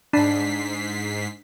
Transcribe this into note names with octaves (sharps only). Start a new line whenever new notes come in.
G#2 D4 B6 C7